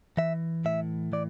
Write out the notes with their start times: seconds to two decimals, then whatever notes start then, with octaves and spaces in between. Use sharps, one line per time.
0.17 E3 E5
0.65 A2 E5
1.13 E3 D5